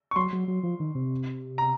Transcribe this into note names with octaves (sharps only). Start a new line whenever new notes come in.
C#6
F#3 C6
F#3
F#3
F3
D#3
C3
A#5